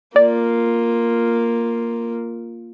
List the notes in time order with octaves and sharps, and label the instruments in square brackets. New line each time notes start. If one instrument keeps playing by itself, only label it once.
[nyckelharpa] A#3 F4 [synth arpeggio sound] D5